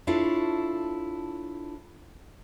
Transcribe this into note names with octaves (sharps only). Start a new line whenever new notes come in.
D4 E4 F4 A4 C#5